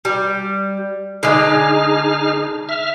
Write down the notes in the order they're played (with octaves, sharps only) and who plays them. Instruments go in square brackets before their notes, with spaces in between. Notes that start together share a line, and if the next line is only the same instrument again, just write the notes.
[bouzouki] G3
[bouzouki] D3 G#3 [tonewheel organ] D#4 G#4 F6
[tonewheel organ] E5 F6